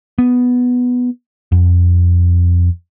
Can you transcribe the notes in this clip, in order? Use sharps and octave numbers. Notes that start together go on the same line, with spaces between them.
B3
F2